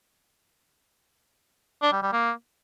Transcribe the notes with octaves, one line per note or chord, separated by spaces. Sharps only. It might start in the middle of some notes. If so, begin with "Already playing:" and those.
D4
G3
G3
A#3